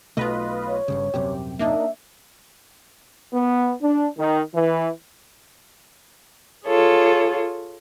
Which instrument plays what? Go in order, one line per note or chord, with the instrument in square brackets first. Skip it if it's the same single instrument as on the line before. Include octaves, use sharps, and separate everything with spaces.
[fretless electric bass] B1 B2 A3 [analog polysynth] F4 B4 D#5
[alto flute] C#5
[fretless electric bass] G1 G2 C#3
[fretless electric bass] D#1 F#2 C3 [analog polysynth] G4
[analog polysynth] A#3 D4 D#4 [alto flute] E5
[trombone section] B3
D4
D#3
E3
[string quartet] F4 G#4 A4 C#5